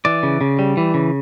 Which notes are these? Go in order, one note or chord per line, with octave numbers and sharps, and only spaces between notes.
E3 D5
C#3
C#3
G3
E3
C#3